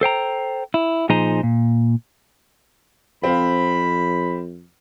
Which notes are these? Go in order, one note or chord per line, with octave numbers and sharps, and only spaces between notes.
A4 C5 G5 A#5
E4
A#2 F3 D#4 G#4 C5 A#5
A#2
F2 C4 F5 B5